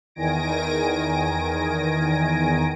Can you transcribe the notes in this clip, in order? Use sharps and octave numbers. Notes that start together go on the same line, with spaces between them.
E2 D#3 G#5 A#6 D7